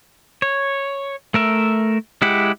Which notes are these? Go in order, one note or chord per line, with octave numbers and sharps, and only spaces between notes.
C#5
A3 A#4 E5
G#3 E4 G4 F#5